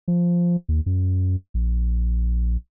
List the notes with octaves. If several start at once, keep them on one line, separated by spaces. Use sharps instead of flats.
F3
D#2
F#2
A#1